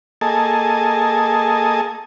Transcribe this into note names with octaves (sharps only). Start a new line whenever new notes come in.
A#3 G#4 A4 D#5 G#5 A5